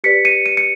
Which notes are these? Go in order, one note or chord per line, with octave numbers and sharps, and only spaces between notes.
G4 B4 D5 B6 C#7
C#7 D#7
C#7 D#7
C#7